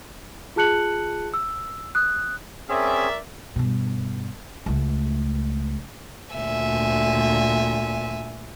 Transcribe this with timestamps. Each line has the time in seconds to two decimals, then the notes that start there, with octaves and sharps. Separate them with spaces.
0.56 F4 G#4 A5 F#6 C#7 F#7
1.34 E6
1.95 D#6 F#6
2.69 C4 C#4 G#4 A#4 D5 E5
3.56 G2 B2
4.66 C#2 A3
6.36 D2 A#2 E5 G#5